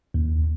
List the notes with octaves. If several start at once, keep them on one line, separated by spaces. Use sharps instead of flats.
D#2